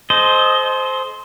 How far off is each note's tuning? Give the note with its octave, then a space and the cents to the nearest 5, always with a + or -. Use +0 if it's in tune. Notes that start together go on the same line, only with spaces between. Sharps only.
A4 -45 C5 +0 D#5 +0